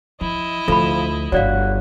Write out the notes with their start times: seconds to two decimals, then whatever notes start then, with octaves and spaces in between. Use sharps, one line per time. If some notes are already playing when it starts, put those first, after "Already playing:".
0.21 F3 E4 D#5
0.68 D2 F3 A4 B5
1.32 G1 D4 F#4 C#5 D5 F5